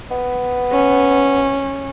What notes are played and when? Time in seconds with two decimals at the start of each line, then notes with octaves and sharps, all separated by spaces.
0.11 B3
0.72 C#4